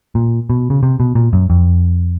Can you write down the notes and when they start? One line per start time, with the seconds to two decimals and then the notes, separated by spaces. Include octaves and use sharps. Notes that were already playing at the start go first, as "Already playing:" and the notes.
0.15 A#2
0.50 B2
0.70 C#3
0.83 C3
1.00 B2
1.15 A#2
1.33 F#2
1.50 F2